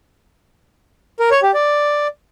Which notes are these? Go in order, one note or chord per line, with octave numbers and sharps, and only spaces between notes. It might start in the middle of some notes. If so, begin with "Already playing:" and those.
A#4
C#5
G4
D5